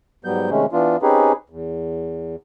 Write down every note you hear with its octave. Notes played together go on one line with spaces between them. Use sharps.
G#2 F#3 G3 B3 G6
C3 D#3 G#3 A3 C#4
E3 B3 D4 F4
C4 C#4 D#4 G4 G#4 B4
E2